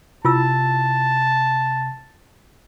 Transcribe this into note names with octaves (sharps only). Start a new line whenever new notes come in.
C3 E4 F4 A5 E6